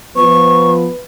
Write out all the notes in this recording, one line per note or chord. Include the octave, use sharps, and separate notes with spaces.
F3 B3 B4 C#6